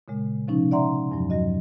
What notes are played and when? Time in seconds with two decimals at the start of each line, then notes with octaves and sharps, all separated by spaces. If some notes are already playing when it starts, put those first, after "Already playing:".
0.08 A#2 C#3 G#3
0.48 C3 F3 C#4 D#4
0.71 D5 E5 F#5 A#5 C6
1.11 E2 G2 F3 F#3
1.30 F#3 F#4 D#5